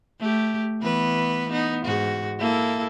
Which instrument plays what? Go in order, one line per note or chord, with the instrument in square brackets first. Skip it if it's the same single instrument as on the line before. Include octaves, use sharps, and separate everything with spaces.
[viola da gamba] A3 G4
E3 B3 B4
B3 D#4
G#2 F#4
A#3 E4 A4